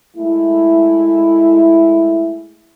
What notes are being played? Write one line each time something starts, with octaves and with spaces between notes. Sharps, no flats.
G#3 A3 E4